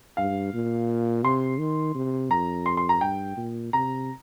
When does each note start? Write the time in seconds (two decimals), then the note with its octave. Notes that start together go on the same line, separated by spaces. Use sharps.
0.17 G2 F5
0.54 A#2
1.24 C3 C6
1.59 D#3
1.95 C3
2.31 F2 A#5
2.66 C6
2.77 C6
2.89 A#5
3.01 G2 G5
3.37 A#2
3.73 C3 A#5